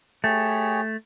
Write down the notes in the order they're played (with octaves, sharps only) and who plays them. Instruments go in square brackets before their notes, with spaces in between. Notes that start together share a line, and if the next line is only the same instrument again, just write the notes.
[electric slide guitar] A3 [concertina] G4 G#4 C#5